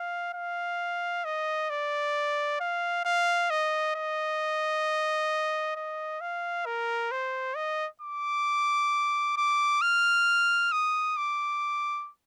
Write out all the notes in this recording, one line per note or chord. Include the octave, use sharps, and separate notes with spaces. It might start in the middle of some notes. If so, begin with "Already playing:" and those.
Already playing: F5
F5
D#5
D5
F5
F5
D#5
D#5
D#5
F5
A#4
C5
D#5
D6
D6
F6
D#6
D6